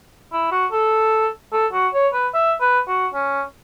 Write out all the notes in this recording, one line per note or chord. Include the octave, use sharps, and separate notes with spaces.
E4
F#4
A4
A4
F#4
C#5
B4
E5
B4
F#4
C#4